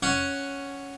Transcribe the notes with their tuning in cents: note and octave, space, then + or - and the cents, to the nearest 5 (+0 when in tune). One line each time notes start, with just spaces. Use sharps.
C#4 +0 F#5 +0